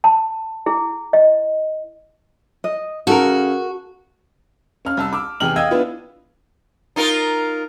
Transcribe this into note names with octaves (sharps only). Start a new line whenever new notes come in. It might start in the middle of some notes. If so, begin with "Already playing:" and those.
A5
E4 G#4
D#5
D#5
C#3 F#4 A4 A#4
C#4 F5 F6
C2 A5 E6
D6 E6
E2 C3 G#4 G5 F6 F#7
D#5 F5 G5 D#6 E6 G#6
B3 D4 E4 F4 B4
D#4 F4 A#4